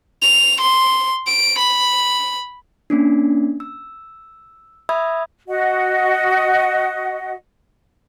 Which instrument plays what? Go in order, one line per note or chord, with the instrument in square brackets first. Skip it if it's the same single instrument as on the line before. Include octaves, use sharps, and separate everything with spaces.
[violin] F7
C6
D7
B5
[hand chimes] A#3 C#4 D4
E6
E5 B5 D#6 E6 G#6
[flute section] F#4 D#5 F#5